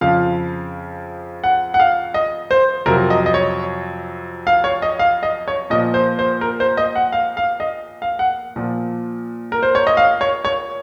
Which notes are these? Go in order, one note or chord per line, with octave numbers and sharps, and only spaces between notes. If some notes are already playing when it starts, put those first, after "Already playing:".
F2 C#3 F3 F5
F#5
F#5
F5
D#5
C5
F2 C3 F#3 A#4
D#5
D#5
C#5
F5
C#5
D#5
F5
D#5
C#5
A#2 F3 D#5
C5
C5
A#4
C5
D#5
F#5
F5
F5
D#5
F5
F#5
A#2 F3
A#4
C5
C#5
D#5
F5
C#5
C#5